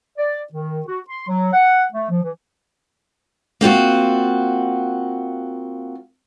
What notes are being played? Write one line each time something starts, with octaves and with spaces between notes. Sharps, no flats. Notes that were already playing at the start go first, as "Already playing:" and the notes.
D5
D#3
F#4
C6
F#3
F#5
A3
F3
E3
A#3 C4 F4 F#4